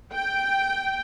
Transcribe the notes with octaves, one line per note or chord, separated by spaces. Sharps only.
G5